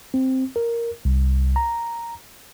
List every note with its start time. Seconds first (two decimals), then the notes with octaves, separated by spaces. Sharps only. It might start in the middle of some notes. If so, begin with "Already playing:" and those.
0.14 C4
0.56 A#4
1.05 C2
1.56 A#5